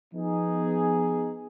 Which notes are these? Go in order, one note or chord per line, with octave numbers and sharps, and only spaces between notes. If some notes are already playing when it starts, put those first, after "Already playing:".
F3 B3 D#4 G#4